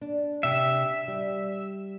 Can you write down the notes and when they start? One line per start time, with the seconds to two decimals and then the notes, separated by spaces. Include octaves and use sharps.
0.01 D4
0.43 C3 E5
1.08 G3